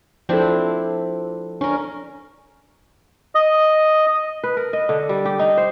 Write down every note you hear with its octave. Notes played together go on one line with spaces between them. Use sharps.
F3 C4 D4 E4 A4
C#4 D4 A#4
D#5
B4
A#4
D#5
D3
G3
G4
D#4
C5